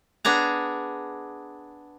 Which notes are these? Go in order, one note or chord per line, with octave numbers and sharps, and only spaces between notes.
B3 D4 G#4 A#5